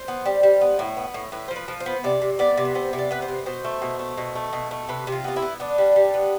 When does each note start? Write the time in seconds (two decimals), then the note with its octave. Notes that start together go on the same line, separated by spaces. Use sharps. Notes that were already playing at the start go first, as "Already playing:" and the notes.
Already playing: C5
0.08 B3
0.26 G3
0.43 G3
0.61 B3
0.79 A2
0.97 B3
1.14 A2
1.32 A2 B4
1.48 C5
1.51 F3
1.56 B4
1.68 F3
1.80 C5
1.86 B3
2.04 C3 D5
2.22 C3
2.39 B3 D5
2.57 C3
2.65 B4
2.75 B3 C5
2.93 C3
2.99 D5
3.11 B3 B4
3.22 C5
3.28 C3
3.46 B2 C5
3.64 A3
3.82 B2
3.99 A3
4.17 B2
4.35 A3
4.53 B2
4.71 A3
4.89 C3 B4
5.07 C3
5.12 F4
5.24 B3 F4
5.36 E4
5.42 B3
5.60 B3 D4
5.78 G3
5.96 G3
6.14 B3